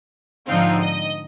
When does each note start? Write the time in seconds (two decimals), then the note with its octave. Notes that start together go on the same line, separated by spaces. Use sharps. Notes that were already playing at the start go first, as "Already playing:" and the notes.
0.48 G#2 D3 F3 C4 D#4 F4
0.82 D#5